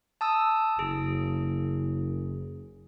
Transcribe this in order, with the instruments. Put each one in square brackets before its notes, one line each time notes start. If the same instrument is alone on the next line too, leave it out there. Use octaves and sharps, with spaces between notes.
[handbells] A5 D#6 E6
[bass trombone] F#1 [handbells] G#4